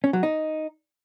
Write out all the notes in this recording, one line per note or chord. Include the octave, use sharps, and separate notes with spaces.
C#4
F#3
D#4